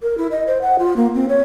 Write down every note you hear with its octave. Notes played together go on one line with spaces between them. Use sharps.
A#4
E4
D#5
C5
F#5
F4
A#3
C4
C#5